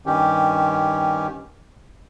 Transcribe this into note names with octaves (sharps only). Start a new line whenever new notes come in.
G2 D#3 C#4 G4